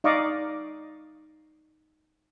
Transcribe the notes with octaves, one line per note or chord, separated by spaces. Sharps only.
D#4 D5 D#5 F5 C#6 D6